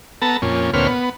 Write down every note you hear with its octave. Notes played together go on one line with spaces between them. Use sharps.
B3 A4 A5 A#5
F2 A#2 C#4
D2 A#2 C4 B4 C#5 F6
B3